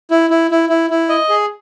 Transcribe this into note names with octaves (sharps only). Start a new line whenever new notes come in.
E4
E4
E4
E4
E4
D#5
G#4